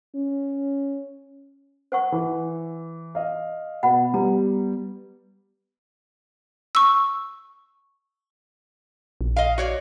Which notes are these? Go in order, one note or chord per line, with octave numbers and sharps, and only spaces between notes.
C#4
C5 F#5 C#6
E3
D#5 F5
B2 B3 D#5 F#5 B5
G3 B3 A#5
C#6 E6
A#1
D#5 F5
F#4 C#5 D5